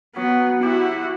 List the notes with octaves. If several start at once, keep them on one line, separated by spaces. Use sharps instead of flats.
F#3 B3
E4 F#4 G4